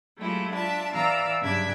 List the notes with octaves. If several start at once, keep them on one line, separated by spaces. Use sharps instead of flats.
F#3 G#3 A3 E4 F4 G4
D4 F4 E5 A5
E3 D5 F5 A#5 E6
G2 C#3 F#3 D4 E5 G#6